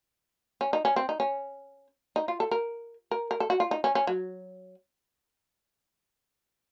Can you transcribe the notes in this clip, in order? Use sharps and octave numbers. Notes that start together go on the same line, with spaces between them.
C#4
D#4
C#4
C4
D#4
C#4
D#4
F4
A4
A#4
A#4
A#4
A4
F#4
F4
D#4
C#4
C#4
F#3